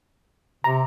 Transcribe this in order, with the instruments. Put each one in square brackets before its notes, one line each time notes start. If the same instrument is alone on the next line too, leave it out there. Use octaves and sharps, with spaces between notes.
[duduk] C3 [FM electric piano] A#5